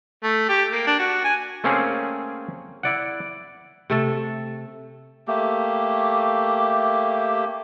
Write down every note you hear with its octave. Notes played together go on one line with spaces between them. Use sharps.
A3
G4
A#3
D4
F#4
G#5
A3 A#3 C4 C#4 G#4
E4 D5 F#5
C3 A3 A4
A3 A#3 G4